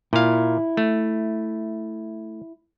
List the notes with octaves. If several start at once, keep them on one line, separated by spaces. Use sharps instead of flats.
A#2 E4 F5
A3